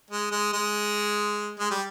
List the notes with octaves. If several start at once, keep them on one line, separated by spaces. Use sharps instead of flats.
G#3
G#3
G#3
G#3
G3